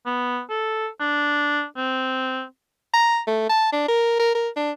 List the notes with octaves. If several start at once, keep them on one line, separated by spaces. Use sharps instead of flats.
B3
A4
D4
C4
A#5
A3
A5
D4
A#4
A#4
A#4
D4